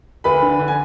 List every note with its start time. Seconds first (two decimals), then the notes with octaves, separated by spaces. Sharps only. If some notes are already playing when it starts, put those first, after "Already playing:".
0.24 D2 B4 B5
0.42 D3
0.59 D3
0.68 G#5